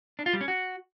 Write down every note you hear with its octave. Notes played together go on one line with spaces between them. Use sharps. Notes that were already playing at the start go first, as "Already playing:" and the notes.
D4
F4
G3
C#4
F#4